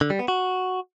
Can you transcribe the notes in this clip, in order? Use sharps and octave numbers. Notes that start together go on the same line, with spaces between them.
D3
G3
B3
F#4